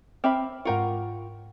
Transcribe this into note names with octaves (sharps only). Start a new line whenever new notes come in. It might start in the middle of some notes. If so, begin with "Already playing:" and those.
C4 E5 B5 D6 F6
G#2 F4 A#4 F#5 G5 C#6